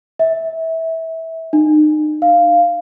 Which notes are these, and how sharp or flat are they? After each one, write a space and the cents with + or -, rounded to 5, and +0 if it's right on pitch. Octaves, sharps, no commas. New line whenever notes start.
E5 -20
D#4 -35
F5 -5